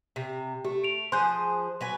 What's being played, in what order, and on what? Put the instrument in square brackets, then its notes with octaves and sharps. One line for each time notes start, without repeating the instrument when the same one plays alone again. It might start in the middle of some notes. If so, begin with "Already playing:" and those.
[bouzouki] C3
[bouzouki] A3 [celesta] G4
[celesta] D7 F7
[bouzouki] F3 G#4 C5 [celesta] C6 F#6 G6
[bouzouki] F#3 B4 G#5